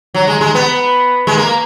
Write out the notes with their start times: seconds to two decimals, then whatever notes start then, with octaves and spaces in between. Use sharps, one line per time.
0.14 F#3
0.27 G#3
0.41 G#3
0.55 B3
1.27 G#3
1.38 A#3